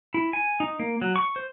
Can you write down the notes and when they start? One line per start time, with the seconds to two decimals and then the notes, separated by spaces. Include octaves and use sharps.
0.14 E4
0.33 G#5
0.60 D#4
0.79 A#3
1.02 F#3
1.16 C#6
1.36 C5